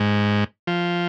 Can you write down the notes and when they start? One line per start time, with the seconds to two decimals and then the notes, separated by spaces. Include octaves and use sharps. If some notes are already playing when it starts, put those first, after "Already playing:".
Already playing: G#2
0.67 F3